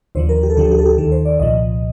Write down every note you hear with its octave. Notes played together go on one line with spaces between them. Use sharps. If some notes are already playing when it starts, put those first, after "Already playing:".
D#2 D3 F3 C5
A#4
G4
A4
D2 D3 F3 G4
A4
G4
A4
G4
D#2 D#3 A4
C5
D5
C2 A#2 F3 D#5